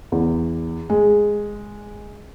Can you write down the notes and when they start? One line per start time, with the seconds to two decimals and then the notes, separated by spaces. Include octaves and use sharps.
0.12 E2
0.90 G#3